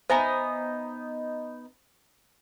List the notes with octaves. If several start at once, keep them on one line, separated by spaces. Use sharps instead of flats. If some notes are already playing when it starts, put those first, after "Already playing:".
B3 D#4 C5 E5 G#5 A#5